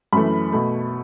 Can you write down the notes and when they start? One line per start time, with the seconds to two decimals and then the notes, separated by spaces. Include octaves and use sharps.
0.13 F#2 E3 A3 B5
0.52 B2 A3